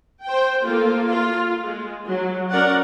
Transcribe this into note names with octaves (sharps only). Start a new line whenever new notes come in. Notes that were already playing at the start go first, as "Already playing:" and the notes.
C5 G5
A#3 F4 A4
F4
G#3
F#3
C#4 A#4 D5 F#5